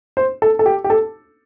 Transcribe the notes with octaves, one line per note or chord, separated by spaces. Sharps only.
C5
A4
A4
G4
G4
A4